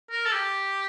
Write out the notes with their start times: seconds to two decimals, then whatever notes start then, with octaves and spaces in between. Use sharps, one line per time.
0.11 A#4
0.26 A4
0.32 G4